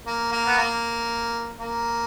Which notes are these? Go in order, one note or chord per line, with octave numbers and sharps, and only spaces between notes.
A#3
A#3
B3
A#3
A#3